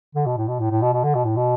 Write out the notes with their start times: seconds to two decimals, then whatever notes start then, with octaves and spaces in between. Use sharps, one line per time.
0.15 D3
0.26 B2
0.37 A2
0.48 B2
0.60 A2
0.70 A2
0.82 B2
0.93 B2
1.04 D3
1.15 B2
1.25 A2
1.37 B2